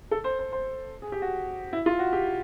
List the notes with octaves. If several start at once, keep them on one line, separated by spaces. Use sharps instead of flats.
A4
C5
C5
C5
G#4
G4
F#4
E4
F4
F#4
G4